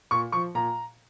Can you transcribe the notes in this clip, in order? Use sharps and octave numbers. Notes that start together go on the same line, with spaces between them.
A#2 C#6
F3 C#6
A#2 A#5